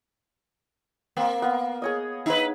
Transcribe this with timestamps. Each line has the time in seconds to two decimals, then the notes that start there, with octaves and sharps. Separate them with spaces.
1.17 A#3 C4
1.42 B3 F5
1.82 G#4 C#5 D#5
2.26 D#4 B4